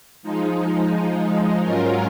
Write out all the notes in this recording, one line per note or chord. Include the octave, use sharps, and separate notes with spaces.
F3 G#3 D#4
G#2 F#3 C#4 F4 A#4